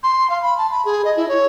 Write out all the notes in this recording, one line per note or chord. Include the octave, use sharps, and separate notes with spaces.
C6
F5
B5
A5
B5
G#4
D#5
E4
C#5